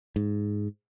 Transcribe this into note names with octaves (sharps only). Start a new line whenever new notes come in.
G#2